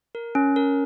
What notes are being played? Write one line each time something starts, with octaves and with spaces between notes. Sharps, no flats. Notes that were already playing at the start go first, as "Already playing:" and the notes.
A#4
C#4
A#4